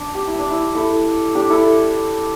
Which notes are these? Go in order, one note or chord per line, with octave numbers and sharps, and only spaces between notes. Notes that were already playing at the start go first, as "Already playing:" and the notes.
Already playing: D4
G4
E4
D4
E4
E4 A4
D4 G4
E4 A4